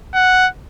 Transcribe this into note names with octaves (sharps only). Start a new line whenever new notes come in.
F#5